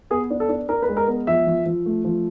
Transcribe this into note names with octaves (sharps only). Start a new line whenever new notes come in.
B3 G#4
D4
A4
D4
D4 A#4
B4
G#3
A#4
B3
F3 E5
F3
F3
A3
F3